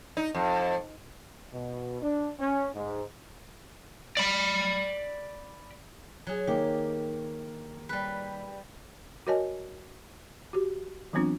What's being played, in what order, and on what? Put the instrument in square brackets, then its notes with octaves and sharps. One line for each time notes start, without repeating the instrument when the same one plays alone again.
[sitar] D#4
F2
[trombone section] B2
D4
C#4
G#2
[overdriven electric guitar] D5 B5
[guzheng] F#3 G#4
[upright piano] D#3 A#3 [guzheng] G4
[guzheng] G3 B4
[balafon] F#4 A#4 C#5 D#5 G#5 A5
F#4 G4
E3 F#3 B3 C4 D4 F4